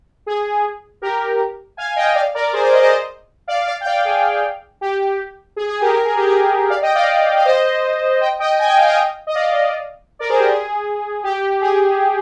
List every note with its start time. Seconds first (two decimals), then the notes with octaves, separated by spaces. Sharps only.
0.26 G#4
1.02 G4 A#4
1.77 F5 G#5
1.96 D#5 G5
2.15 D5 F5
2.34 A#4 D5
2.53 G#4 C5
2.63 A#4 D5
2.72 C5 D#5
2.82 C5 D#5
3.48 D5 F5
3.67 D5 F5
3.81 G5
3.85 D5 F5
4.05 G#4
4.81 G4
5.56 G#4
5.69 G#4
5.81 G4 A#4
5.94 A#4
6.05 G#4
6.16 G4
6.27 G#4
6.70 D5 F5
6.82 D#5 G5
6.95 D5 F5
7.37 F5
7.45 C5 D#5
8.21 D#5 G5
8.39 D#5 G5
8.59 G#5
8.67 G5
8.77 F5
8.87 D#5 G5
9.27 D#5
9.35 D5 F5
10.19 A#4 D5
10.29 G#4 C5
10.39 G4 A#4
10.49 G#4
11.23 G4
11.61 G#4